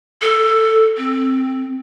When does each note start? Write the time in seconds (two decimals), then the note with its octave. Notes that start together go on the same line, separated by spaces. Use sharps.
0.22 A4
0.98 C4